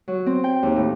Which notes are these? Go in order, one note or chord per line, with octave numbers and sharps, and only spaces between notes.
F#3
C4
G5
D#2
A2